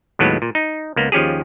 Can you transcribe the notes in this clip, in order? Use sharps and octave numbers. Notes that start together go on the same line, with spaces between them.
D#2 A2 F#3 G#3 B3
A#2
D#4
C#2 A#3 B3
D#2 F3 C#4 G4 G#4